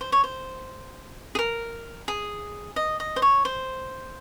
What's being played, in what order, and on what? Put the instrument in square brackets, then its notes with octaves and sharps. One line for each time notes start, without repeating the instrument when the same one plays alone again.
[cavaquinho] C5
C#5
C5
G#4
A#4
G#4
D#5
D#5
C5
C#5
C5